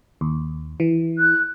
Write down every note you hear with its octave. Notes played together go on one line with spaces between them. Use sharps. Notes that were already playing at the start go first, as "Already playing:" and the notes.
D#2
E3
F#6